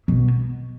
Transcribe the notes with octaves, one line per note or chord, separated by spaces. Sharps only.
B2